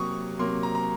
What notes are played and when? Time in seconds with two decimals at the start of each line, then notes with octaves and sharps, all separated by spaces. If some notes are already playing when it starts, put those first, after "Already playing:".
Already playing: C3 F#3 A#3 C#6 D#6
0.39 C3 F#3 A#3 C6
0.63 A#5
0.75 A#5